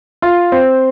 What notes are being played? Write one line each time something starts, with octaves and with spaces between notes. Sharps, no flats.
F4
C4